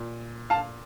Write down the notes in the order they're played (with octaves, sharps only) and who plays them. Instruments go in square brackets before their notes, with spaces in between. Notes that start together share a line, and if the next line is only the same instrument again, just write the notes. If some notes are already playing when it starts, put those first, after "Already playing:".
Already playing: [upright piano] A#2
F5 A5